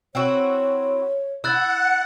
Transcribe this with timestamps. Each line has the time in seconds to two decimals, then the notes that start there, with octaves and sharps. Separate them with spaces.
0.15 C4 E4 F#4 C#5
1.44 E4 F#5 E6 F#6 A6